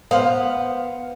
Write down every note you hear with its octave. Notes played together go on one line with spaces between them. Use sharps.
B3 C5 F5